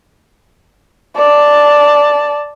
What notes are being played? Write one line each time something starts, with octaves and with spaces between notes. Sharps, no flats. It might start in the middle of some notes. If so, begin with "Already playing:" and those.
D5 A5